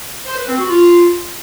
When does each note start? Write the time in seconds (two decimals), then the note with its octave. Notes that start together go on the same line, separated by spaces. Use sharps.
0.26 C5
0.37 B4
0.48 C4
0.58 F#4
0.69 F4